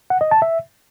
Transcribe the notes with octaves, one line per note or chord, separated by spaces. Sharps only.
F#5
D#5
A5
E5